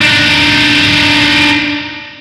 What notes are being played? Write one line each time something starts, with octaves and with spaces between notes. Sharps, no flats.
D4 D#4